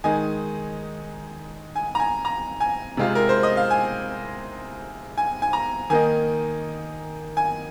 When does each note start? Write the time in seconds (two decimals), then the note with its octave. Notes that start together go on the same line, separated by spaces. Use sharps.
0.04 D#3 G#3 D#4 G#5
1.76 G#5
1.95 A#5
2.00 G#5
2.25 A#5
2.60 G#5
2.97 C3 G#3 C4 F4
3.15 A#4
3.29 C5
3.43 D#5
3.57 F5
3.71 G#5
5.18 G#5
5.42 G#5
5.53 A#5
5.90 D#3 A#3 D#4 G#5
7.37 G#5